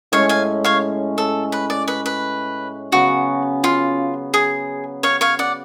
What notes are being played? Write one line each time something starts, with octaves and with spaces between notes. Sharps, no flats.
A2 G#3 C#4 C#5 F5
F5 G#5
C#5 F5
A4
B4
D5
B4
B4
C#3 F#3 B3 F#4
F4
G#4
C#5 F5
C#5 F5
D5 F#5